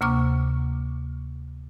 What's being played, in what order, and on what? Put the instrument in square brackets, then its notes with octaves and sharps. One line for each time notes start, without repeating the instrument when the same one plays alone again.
[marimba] D2 C3 A#3 C#6 D6 F6